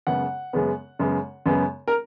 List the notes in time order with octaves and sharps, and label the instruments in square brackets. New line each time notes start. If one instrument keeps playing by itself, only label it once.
[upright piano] F#2 C#3 G#3 B3 F#5
F#2 C#3 G#3 B3
F#2 C#3 G#3 B3
F#2 C#3 G#3 B3
A#4